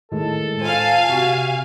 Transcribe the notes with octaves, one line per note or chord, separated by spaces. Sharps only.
A2 D#3 G#3 A4
F4 C5 F5 G#5
C3 F#4